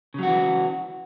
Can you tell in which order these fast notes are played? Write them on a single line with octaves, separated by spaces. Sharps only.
C#3 F#3 F#4 E3